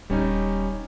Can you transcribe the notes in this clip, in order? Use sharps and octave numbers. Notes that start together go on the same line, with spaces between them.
D#1 G3 C#4 D#4